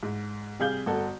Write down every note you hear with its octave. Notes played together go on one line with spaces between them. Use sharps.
G#2
C3 G3 G#4 F5 G6 G7
G1 F#4 A4